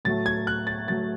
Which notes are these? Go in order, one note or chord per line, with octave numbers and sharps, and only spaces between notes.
A2 F#3 A3 A6
G#6
F#6
A6
A2 F#3 A3 A6